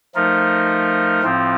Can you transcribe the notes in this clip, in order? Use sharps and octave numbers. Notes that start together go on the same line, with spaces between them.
F3 A3 D#4 A#4
A2 F3 C4 F4